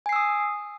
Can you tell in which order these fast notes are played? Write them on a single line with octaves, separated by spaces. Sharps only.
G#5 C7 E6 D#6